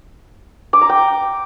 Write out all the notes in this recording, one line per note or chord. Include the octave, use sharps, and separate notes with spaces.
D6
A#5
G5